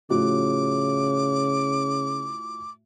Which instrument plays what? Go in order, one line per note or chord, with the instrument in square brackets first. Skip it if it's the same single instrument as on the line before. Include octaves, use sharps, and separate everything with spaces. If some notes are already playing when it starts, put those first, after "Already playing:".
[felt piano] A2 F3 F#4 [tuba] C#3 [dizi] D6